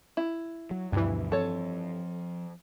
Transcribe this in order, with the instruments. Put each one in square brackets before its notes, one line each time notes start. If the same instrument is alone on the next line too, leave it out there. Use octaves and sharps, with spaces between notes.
[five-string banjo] E4
[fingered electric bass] F#3
[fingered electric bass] D2 B2 F3 [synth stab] G2 E3
[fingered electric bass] F3 C4 [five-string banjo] A4 C#5